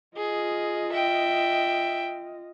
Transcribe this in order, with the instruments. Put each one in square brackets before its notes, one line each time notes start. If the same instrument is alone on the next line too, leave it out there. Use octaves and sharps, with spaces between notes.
[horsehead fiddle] F4 D#5 [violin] G#4
[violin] E5 G5